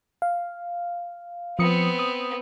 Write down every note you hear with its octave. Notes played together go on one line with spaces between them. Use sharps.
F5
F3 B3 C4 D#6 C#7
D#6